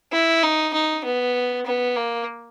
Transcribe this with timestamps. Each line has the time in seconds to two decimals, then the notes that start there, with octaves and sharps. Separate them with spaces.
0.13 E4
0.43 D#4
0.74 D#4
1.05 B3
1.66 B3
1.96 A#3